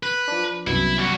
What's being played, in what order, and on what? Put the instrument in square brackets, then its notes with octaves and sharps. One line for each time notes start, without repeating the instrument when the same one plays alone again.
[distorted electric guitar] B4
[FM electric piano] F3 D4
[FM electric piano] C2 F#2 B2 [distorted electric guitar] E4
[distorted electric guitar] G3 F#4